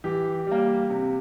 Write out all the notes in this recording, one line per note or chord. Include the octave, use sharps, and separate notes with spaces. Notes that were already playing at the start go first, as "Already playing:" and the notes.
E3 G4
G3 A#3
C3